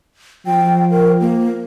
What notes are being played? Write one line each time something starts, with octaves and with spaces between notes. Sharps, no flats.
F3 G5
A#4
A#3